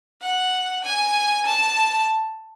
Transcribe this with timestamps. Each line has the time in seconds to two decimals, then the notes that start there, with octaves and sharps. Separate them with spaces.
0.22 F#5
0.84 G#5
1.46 A5